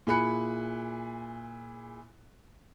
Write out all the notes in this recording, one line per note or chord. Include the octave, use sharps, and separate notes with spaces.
A#2 E4 G#4 B5 F#6 C#7